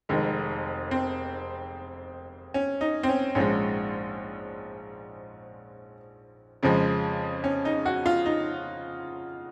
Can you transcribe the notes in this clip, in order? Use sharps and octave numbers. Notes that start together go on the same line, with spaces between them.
F1 F2 D#3 G#3
C4
C#4
D#4
C4
C#4
A#1 G#2 F3 G#3 C#4
F2 C#3 F3 G#3
C#4
D#4
F#4
F4
D#4